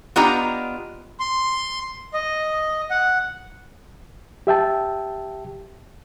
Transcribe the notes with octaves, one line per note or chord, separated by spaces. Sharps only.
B3 D4 F4 G4 D#5 A#5
C6
D#5
F#5
G4 E5 G5 A5